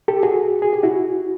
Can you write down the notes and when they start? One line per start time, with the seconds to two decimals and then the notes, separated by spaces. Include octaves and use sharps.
0.08 G4 A4
0.23 F#4 G#4
0.62 G#4
0.73 G4
0.83 E4 F#4